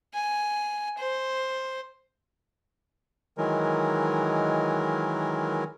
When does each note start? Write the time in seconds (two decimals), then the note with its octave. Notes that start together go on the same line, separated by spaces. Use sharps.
0.14 G#5
0.98 C5
3.38 D#3 E3 F#3 G#3 A#4